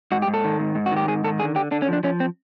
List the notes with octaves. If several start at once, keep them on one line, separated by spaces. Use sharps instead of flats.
G#2 F#4
G4
G#2
A4
D#3
G#2
G#2
F#4
D#3
G4
G#2 G#4
D#3 A4
D3 G#4
D3 G4
D3 D4
C#4
F3 D4
F3 C#4
C4